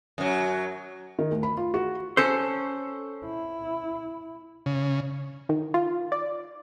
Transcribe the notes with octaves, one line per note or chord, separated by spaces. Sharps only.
F#2 F#3
D#3
D2
B5
F4
F#4
C#4 A4 C5
E4
C#3
D#3
F4
D5